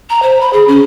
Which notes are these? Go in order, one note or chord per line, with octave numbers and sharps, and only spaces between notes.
A#5
C5
B5
G#4
C#4